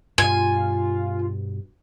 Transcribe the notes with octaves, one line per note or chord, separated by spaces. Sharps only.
G2 B2 F4 G#5